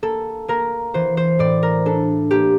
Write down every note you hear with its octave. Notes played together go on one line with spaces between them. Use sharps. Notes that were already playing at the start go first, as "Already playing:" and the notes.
A#3 A4
A#3 A#4
E3 C5
C5
A2 D5
A#4
D4 A4
A#3 G4